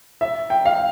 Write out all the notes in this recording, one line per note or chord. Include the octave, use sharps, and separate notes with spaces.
E5
G5
F5